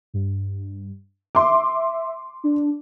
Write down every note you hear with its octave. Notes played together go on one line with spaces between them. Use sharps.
G2
E5 C6 D6
D4